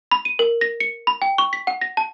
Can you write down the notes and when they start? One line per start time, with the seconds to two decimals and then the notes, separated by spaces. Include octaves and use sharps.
0.12 B5
0.25 D#7
0.39 A#4
0.61 A#6
0.80 C#7
1.07 B5
1.22 G5
1.38 C#6
1.53 B6
1.67 F#5
1.81 A#6
1.97 A5